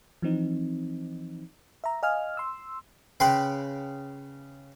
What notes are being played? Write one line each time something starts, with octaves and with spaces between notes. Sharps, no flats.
E3 F3 C4 D#4
E5 A#5
D#5 F5 G#5 F6
C6 E6
C#3 B4 G5 B5 C6